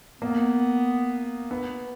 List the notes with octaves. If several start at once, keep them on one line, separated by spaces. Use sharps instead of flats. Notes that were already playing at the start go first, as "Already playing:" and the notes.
A#3 B3
B3